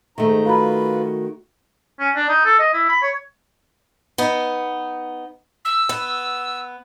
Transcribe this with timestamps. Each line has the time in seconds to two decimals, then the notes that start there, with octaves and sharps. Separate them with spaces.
0.18 G#2 D#3 A3 A#5
0.45 F4 F#4 B4 F5 A#5 B5
2.00 C#4
2.16 D4
2.29 D#4
2.45 A4
2.59 D#5
2.73 E4
2.89 B5
3.03 C#5
4.18 B3 D#4
5.65 E6
5.89 B3